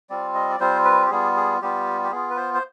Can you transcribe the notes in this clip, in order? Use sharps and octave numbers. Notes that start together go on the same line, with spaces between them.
G3 C4 F4 D5
D#5
D5
G3 C4 F4 C5
B4
G4
G3 B3 F4 G#4
G#4
G3 B3 F4 G4
G4
B3 F4 G#4
B4
C5
C5